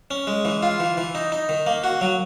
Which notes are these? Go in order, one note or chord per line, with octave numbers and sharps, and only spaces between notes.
C#4
G#3
E3
F4
E3
E3
D#4
D#4
D#3
A#3
F#4
F#3